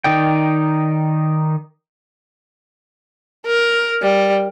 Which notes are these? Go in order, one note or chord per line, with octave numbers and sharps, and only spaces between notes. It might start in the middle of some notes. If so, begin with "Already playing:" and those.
D#3 D#4 D5 G5
A#4
G3